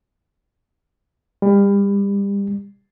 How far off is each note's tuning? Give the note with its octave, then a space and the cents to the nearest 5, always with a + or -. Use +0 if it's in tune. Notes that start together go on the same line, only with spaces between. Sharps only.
G3 +30